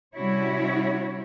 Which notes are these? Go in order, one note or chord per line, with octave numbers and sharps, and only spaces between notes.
C3 G3 C#4 E4 F#4 C#5